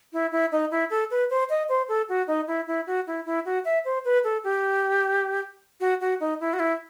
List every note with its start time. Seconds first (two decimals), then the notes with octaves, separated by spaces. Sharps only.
0.13 E4
0.32 E4
0.52 D#4
0.71 E4
0.90 A4
1.11 B4
1.30 C5
1.50 D#5
1.69 C5
1.88 A4
2.09 F#4
2.27 D#4
2.47 E4
2.67 E4
2.87 F#4
3.07 E4
3.26 E4
3.45 F#4
3.65 E5
3.85 C5
4.05 B4
4.24 A4
4.44 G4
5.80 F#4
6.01 F#4
6.20 D#4
6.40 E4
6.53 F#4
6.59 E4